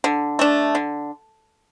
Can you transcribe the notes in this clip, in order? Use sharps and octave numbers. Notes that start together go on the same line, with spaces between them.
D3
A3 D4
D3